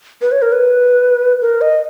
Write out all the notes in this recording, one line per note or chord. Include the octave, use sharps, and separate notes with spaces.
B4
C#5
A#4
B4
A#4
D#5